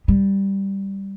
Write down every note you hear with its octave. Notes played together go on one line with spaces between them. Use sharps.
G3